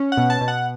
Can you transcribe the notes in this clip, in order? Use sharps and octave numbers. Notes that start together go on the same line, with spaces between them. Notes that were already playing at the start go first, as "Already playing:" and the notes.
Already playing: C#4
F#5
B2
A5
B2
F#5